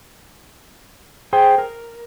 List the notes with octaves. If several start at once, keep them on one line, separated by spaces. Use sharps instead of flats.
G#4 C5 G5
A#4